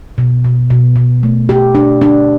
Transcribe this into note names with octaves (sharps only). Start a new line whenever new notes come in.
B2
B2
B2
B2
A3
G4
D4
D4